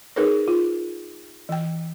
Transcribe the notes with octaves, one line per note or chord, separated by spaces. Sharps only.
D#4 G#4 A#4 B4 C#5
F4
E3 G5